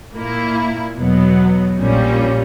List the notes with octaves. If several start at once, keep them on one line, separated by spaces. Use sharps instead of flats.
A#2 A#3 E4
E2 B2 F#3 B3
A#1 A#2 G3 C#4